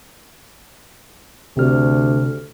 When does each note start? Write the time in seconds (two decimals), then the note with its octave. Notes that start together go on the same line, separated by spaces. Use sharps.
1.57 D2 C3 F6